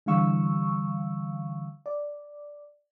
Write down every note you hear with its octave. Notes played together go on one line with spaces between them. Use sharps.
D3 E3 G3 F5 C#6 E6
D5